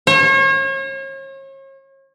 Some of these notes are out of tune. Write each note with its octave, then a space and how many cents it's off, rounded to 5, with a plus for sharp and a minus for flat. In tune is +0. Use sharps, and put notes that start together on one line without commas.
C#5 -40